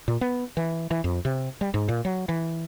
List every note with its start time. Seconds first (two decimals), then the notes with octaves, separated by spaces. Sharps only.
0.08 A#2
0.21 B3
0.57 E3
0.91 E3
1.04 F2
1.25 C3
1.61 G3
1.74 G#2
1.88 A#2
2.05 F#3
2.29 E3